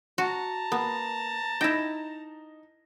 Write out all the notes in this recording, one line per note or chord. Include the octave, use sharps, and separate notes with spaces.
F#4 A5 A#5
A#3 B3
D#4 E4 G5 A#6 E7